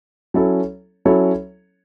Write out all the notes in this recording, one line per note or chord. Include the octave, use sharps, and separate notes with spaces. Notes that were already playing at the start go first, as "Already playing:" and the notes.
F#3 C#4 E4 A4 C#5
F#3 C#4 E4 A4 C#5